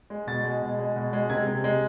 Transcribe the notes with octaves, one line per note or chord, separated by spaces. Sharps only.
G#3
B2 A6
G#3
B2
G#3
B2
G#3
C3 G#6
C3
G#3